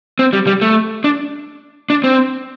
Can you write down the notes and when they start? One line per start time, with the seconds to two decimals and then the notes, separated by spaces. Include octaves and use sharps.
0.19 C4
0.33 G3
0.47 G3
0.61 A3
1.04 D4
1.90 D4
2.04 C4